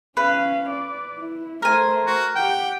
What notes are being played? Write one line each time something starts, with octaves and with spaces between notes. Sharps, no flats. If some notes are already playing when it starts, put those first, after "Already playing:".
C#4 B4 F5
D5
E4
A3 A#4 C5 G#5
F#4
G4 F#5 G5